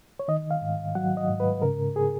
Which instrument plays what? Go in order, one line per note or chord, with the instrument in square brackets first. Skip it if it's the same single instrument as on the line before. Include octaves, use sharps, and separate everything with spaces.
[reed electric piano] C#5
D#3 D#5
F5
G#2
F#3 F#5
D#5
G#2
B4
C#3 A#4
G#4